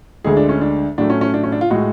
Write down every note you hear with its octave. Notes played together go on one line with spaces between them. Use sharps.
D2 D3 G#3 G#4
D4
C#4
D4
A2 F#3 A3 D4
C#4
C#4
D4
C#4
D4
F4
A2 G#3 F#4